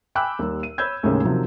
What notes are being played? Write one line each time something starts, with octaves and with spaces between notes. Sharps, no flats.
G5 G#5 B5 D6 E6 F#6
D#2 G3
D#7
C#5 B5 E6 G6 G#6
D#2 A2 C#3 G#3 C#4
C3 D#3 F3 F#3